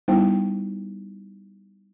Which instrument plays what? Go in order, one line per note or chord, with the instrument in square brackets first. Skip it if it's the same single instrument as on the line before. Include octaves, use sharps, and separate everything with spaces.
[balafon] G3 B3 D#4 E4 C5 G5